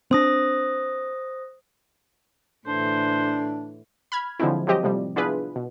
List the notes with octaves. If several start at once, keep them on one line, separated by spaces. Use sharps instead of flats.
C4 D4 C5 D#6 A#6
A2 D3 E3 D4 C5
B5 F6 G#6
D3 F3 F#3 G#3 C4 E4
F3 F#3 G#3 C4 G4 D#5
A2 C3 F3 G3
B3 D4 E4 F4 G#4 B4
B2